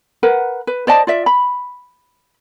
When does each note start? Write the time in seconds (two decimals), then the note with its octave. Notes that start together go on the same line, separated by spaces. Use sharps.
0.23 A#4 B4 F#5
0.67 B4
0.87 C5 D5 D#5 A5
1.07 F4 D5 E5
1.26 B5